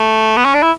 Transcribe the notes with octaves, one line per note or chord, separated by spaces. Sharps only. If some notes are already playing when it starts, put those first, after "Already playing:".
Already playing: A3
B3
C#4
D4
E4